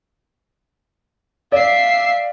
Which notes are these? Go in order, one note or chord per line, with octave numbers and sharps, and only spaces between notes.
D5 E5 F5 C7